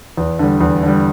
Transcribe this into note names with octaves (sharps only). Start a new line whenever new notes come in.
E2
D3 G3
E2
D3 G3